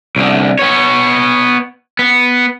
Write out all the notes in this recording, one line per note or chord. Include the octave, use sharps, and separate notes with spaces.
C2 D3
B3 C#5
B3